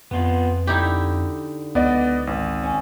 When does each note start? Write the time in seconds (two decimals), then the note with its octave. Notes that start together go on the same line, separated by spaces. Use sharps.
0.11 F2 B3 F4
0.67 D3 D#4 E4 G4
1.75 C#2 B3 D5 D#5
2.27 G#1
2.63 C#4